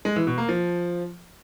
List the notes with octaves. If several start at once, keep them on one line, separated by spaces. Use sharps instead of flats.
G#3
E3
B2
A#3
F3